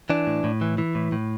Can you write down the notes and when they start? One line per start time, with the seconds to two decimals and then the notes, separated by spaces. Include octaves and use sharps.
0.10 E3 D4
0.27 A2
0.44 A2
0.61 E3
0.78 E3
0.95 A2
1.12 A2